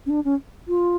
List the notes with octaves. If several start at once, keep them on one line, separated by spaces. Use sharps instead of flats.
C#4
D4
C#4
F4